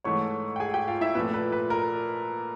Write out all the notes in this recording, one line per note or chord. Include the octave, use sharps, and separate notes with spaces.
G#2 E3 A3 C#5 C#6
G5
G#4 G#5
G4 G5
F4 F5
E4 E5
A#2 F3 A3 B4
B4
B4
A#4